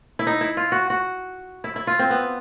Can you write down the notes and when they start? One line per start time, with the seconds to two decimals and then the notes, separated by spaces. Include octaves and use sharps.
0.19 E4
0.27 D#4
0.41 E4
0.57 F4
0.72 F#4
0.90 F#4
1.64 E4
1.76 E4
1.87 F4
1.99 C4
2.10 B3